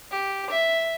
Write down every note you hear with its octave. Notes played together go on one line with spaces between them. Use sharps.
G4
E5